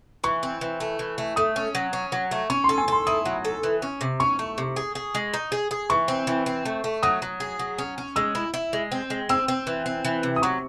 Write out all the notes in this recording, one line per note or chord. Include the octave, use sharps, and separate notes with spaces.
E3 C#6
C4
E3
A3
E3
A3
A3 D#6
C#4
F#3
C#4
F#3
A3
C#4 C#6
C6
A4
G#5
A4 C6
E4 D#6
F#3
A4
E3
C#4
C3
C#4 C#6
A3
C3
G#4
G#4
G#3
D#4
G#4
G#4
E3 C#6
C4
E3
C4
A3
A3
F#3 D#6
F#3
G#4
F#3
C#4
C#4
G#3 E6
E4
E4
G#3
C4
G#3
C4 E6
C4
E3
C4
E3
C3
D#6
F#3 C#6